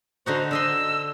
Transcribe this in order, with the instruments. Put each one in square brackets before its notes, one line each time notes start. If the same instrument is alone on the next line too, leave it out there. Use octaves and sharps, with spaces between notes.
[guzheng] D3 D#4 F#4 [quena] C5
[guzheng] D3 D#5 C6 [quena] E6